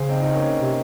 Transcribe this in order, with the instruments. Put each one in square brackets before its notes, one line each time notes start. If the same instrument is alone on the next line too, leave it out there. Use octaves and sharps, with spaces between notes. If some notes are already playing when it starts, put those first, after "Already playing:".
Already playing: [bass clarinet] C#3 [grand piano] G#4 C5
[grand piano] C4 D#4
D#4
A#3 C#4
[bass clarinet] C3